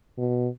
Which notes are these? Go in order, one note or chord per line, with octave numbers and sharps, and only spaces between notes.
B2